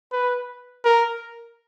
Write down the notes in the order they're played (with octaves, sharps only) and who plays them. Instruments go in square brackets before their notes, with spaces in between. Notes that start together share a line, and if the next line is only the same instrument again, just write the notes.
[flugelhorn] B4
A#4